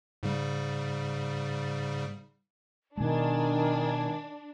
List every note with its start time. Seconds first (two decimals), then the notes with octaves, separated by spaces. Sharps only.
0.23 G#2 C#3 G3
2.97 B2 D#3 G#3 D4 G#5